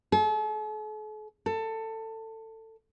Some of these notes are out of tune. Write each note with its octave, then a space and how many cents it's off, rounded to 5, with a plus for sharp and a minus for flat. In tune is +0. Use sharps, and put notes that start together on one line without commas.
A4 -45
A4 +20